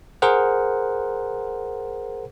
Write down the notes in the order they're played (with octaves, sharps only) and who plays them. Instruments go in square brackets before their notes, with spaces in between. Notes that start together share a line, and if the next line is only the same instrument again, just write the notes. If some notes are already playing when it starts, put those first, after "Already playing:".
[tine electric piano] G#4 A#4 C5 F#5